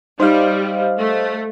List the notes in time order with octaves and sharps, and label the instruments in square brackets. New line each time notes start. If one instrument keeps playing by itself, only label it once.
[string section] G3 [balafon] D#4 [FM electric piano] C5 D#5 F5
[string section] A3